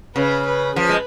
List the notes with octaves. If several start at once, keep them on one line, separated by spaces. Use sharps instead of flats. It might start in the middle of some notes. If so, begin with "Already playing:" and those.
C#3 B4
B4
F3 B4
G#3